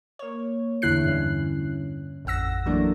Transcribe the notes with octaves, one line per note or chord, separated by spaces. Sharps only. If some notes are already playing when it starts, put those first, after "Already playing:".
A#3 C#5
E2 A2 D3 E4 F#6 C7
G2 C#4
A1 F2 F#5 E6 A#6
E3 F#3 A3 A#3 D4